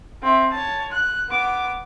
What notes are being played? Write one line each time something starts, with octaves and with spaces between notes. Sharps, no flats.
C4 E5
C#5 A5
F#6
B3 D6